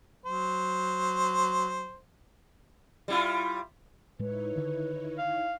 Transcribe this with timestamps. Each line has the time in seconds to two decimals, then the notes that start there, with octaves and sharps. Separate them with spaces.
0.26 F#3 C5
3.08 G3 E4 F4
4.19 A2 G#3 D#4 E4 B4 C#5
4.56 D3 D#3
5.18 F5